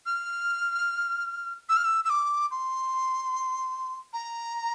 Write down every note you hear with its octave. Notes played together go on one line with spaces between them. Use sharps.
F6
E6
F6
E6
E6
D6
C6
A#5